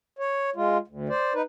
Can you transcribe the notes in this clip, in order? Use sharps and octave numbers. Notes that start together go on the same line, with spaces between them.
C#5
G#3 F4
D2
C5 D5
D#4 B4